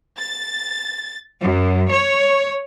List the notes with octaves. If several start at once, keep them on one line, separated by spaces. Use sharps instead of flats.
A6
F#2
C#5